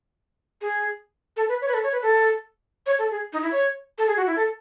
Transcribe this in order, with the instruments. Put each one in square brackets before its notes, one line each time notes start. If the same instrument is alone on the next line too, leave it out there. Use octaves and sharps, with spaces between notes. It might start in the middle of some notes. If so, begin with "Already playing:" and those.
[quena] G#4
A4
B4
C#5
B4
A4
C#5
B4
A4
C#5
A4
G#4
D#4
E4
C#5
A4
G#4
F#4
E4
A4